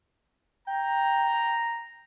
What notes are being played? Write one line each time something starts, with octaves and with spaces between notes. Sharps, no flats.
G5 A#5